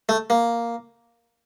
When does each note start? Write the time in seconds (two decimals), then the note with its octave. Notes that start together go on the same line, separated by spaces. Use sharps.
0.09 A3
0.30 A#3